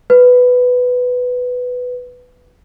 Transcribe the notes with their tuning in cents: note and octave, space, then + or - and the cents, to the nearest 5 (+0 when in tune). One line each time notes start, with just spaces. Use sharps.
B4 +10